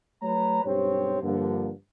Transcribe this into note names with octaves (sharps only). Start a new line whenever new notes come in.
F#3 A3 B4 C#5 A#5
B1 G2 C4 G4 C5 C#5
G2 D3 F3 A#3